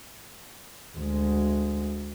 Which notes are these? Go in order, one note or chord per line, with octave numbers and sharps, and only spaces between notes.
D2 G#3